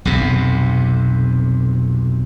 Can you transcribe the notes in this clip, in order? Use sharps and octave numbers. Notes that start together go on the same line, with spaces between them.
B1 F2 C3